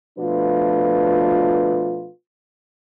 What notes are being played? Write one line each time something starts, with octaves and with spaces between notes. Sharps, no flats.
B2 F3 A3 D4 F4 B4